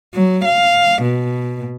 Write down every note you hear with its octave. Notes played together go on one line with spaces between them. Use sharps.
F#3
F5
B2